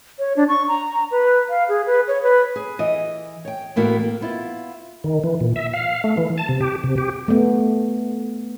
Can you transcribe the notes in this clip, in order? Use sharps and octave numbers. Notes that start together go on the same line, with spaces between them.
C#5
D4
C#6
A#5
B4
F5
G#4
B4
C#5
B4
G#4
E3 D#5
C#5 G5
A2 E3 A#3 B3 E4 F#4
A#3
B3 E4 F4
D#3
E3
A#2
E5
F5
A3
E3
A5
C3
G4
C3
G4
A3 B3